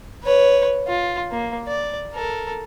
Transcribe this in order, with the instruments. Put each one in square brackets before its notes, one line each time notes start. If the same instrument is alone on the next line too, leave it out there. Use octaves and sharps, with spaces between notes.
[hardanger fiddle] B4 C#5
F4
A#3
D5
A4 A#4